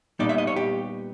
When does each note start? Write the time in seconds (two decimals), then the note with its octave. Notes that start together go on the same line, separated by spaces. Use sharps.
0.19 A#2 G3 B3 D#4 D5
0.29 E5
0.38 D#5
0.47 C#5
0.56 G4